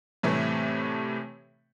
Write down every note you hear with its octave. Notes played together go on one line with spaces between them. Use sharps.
A2 C3 E3 G3 A3